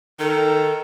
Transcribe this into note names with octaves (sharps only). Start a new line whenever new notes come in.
D#3 A4